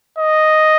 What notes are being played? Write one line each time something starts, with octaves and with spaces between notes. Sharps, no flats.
D#5